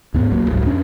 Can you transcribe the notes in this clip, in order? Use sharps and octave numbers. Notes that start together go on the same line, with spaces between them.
D#2 G#2 B3
D1 B1 F#3 A#3
F#1 C#2 A2 F#3
F2 C#4 D4